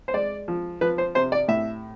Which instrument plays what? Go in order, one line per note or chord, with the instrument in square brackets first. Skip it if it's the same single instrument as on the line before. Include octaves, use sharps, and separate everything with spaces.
[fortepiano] C5
G#3 D5
F3
F3 B4
C5
C3 C5
D5
A2 E5